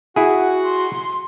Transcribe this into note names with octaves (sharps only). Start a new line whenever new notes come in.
E4 F#4 G#4 F#5
C6